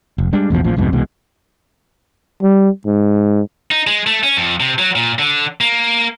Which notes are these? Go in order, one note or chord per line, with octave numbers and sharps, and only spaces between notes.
F1
G3 G#3 D4
A1 E2 B2 F3
A1 A#2 F3
C2 F2 G#2 B2
C2 B2 E3 G#3
G3
G#2
D#4
G#3
A3
C#4
F2
C3
F#3
A#2
D3
A#3